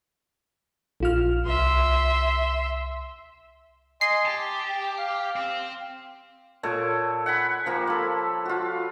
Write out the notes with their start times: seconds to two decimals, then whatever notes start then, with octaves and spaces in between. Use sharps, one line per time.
1.00 A#1 F4 F6
1.46 C2 E5 C6
4.01 D#5 G#5 C6 C7
4.25 G4 A5
4.98 F5
5.36 C4
6.63 A#2 A4 C#5
7.26 F#5 G#5 B5
7.66 F3 A#3 G4
7.87 A4 B5
8.45 F4 F#4